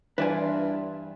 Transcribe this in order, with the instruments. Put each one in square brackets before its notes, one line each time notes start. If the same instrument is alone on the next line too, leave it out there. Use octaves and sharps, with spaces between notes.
[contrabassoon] G2 [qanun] E3 F4 [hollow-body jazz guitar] B4 D5 G#5